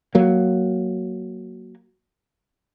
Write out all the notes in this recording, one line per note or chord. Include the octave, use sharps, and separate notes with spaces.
F#3 A#3